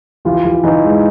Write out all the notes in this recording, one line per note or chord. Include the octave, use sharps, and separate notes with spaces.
E3 F4 G4
E3 F4 G4
E3 D#4 F4
G#2